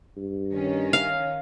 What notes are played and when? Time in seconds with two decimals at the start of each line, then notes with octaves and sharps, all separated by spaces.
0.17 G2
0.51 D#3 C#4
0.93 F5